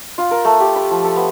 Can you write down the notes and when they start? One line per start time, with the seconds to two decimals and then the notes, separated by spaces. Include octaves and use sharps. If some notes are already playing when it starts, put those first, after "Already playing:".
0.18 F4
0.31 A#4
0.45 A3
0.60 G4
0.76 B5
0.91 F3
1.04 A4
1.16 B3